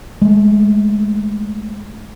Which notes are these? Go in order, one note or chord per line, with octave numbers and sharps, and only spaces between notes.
G#3 A3